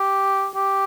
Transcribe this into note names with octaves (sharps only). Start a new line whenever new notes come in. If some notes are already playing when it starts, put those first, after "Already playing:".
Already playing: G4
G4